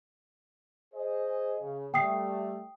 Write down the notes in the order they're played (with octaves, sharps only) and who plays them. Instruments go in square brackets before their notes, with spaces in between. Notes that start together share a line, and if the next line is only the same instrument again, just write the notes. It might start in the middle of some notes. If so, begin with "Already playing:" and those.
[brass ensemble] G#4 C5 D#5
C#3
[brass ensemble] G3 A3 [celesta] G5 D#6 C7